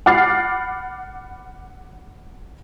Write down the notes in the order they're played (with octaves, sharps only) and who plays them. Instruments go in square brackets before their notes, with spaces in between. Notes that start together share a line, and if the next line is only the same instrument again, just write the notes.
[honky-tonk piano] F#5 B5 D6 F6 A6 C7